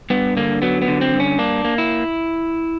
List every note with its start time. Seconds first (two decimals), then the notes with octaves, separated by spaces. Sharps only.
0.10 G2 B3
0.37 D3 A#3
0.62 F#3 B3
0.82 B3
0.88 D3
1.01 C4
1.13 G2
1.20 C#4
1.39 A#3 D4
1.64 A#3
1.78 E4